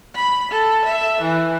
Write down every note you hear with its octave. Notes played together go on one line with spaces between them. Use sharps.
B5
A4
E5
E3